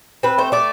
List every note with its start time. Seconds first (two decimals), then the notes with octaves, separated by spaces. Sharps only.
0.23 C4 B4
0.38 A3 C5
0.52 A3 D5